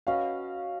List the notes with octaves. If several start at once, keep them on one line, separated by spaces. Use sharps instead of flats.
C#4 F#4 B4 D#5 F5